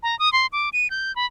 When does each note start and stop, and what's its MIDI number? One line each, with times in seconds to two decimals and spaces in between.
0.03 0.18 82
0.19 0.32 87
0.33 0.47 84
0.52 0.69 86
0.73 0.90 99
0.90 1.15 91
1.16 1.26 83